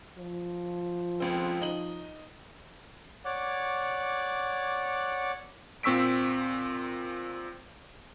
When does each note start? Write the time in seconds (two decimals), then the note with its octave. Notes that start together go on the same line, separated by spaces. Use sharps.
0.18 F3
1.20 F1 C#2 C4
1.61 D#4 F#7
3.25 C#5 D5 F#5 D6
5.83 A#2 C4 C#6 E6 B6 D7